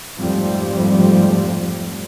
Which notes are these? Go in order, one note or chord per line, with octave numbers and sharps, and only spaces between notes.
F2 G#2 F3 G3 A3 C4